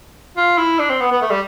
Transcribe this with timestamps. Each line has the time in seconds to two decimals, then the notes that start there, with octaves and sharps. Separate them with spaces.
0.37 F4
0.58 E4
0.79 D4
0.90 C4
1.01 B3
1.12 B3
1.22 A3
1.31 G3